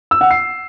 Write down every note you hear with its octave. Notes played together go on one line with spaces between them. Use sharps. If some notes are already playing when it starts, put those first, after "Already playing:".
E6
F#5
C7